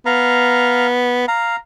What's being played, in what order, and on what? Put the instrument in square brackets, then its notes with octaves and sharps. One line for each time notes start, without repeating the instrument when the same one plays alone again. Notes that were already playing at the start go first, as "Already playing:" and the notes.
[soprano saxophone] B3 [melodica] F5 A#5
[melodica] F5 [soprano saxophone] A#5